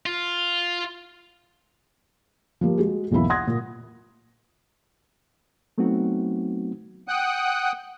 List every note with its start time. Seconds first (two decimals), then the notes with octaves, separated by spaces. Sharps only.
0.06 F4
2.61 F3 G3 A#3
2.78 G#3 F#4 G#4
3.11 B1 E2 A#3 E4 B5
3.30 F#5 C6 D#6 F#6 G#6 A#6
3.47 A#2
5.78 F#3 A3 B3 C4 D#4 F#4
7.08 F#5 G5 D#6 F#6